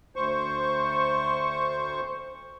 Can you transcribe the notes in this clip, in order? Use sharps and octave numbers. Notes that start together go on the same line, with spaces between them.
D2 C5 C#6